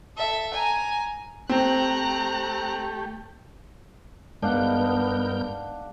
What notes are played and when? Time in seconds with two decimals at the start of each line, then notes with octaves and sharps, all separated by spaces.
0.17 A4 E5
0.53 G#5 A#5
1.49 A3 C4 G4 A#5 F#6
4.42 G2 G#3 B3 D4 A#4 F5 F#5 G6